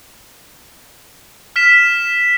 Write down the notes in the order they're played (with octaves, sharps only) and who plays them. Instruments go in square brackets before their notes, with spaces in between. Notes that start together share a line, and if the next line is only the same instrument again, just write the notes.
[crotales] F6 B6 E7